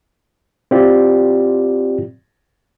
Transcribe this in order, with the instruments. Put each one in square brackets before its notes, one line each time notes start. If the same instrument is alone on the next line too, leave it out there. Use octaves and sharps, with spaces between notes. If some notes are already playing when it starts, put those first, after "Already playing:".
[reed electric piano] C4 E4 F4 G4 D5